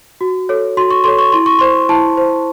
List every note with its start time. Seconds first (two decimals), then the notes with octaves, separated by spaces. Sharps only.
0.21 F#4
0.49 A4 C#5
0.77 F#4 C6
0.91 C#6
1.04 A4 C#5 C6
1.18 C#6
1.32 E4 C6
1.46 C#6
1.59 C5 C6
1.89 E4 A5
2.17 C5